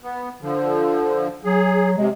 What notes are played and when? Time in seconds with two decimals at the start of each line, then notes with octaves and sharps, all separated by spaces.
0.02 B3
0.42 D3 F3
1.44 F#3 G#4
1.98 C3 G#3